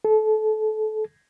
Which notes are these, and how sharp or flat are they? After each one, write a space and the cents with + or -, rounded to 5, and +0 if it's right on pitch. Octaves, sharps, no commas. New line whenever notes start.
A4 -25